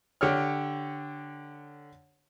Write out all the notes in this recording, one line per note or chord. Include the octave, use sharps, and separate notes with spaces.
D3 G4 C#5 F6